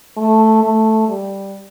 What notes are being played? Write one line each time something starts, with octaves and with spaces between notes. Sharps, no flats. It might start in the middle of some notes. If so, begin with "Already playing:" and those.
A3
A3
G3